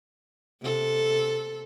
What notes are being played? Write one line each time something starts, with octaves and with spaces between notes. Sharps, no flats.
C3 A4